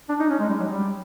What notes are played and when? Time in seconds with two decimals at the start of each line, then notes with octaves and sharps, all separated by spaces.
0.09 D4
0.20 D#4
0.30 C#4
0.40 G#3
0.49 G3
0.60 F#3
0.70 G3